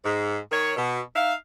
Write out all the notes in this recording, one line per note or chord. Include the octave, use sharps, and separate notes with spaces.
G#2
D#3 C#5
B2
D#4 E5 F5